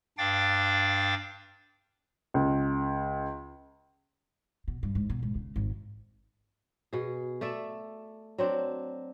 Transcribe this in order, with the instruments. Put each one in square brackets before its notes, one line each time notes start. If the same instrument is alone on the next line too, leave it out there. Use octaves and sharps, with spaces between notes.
[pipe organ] G2 D4 F5 G5 D6 A6
[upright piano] C#2
[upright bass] B2
G2
G#2
B2
G#2
C#3
G#1
[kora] B2 G#4
A3 D5 E5
F#3 C4 D4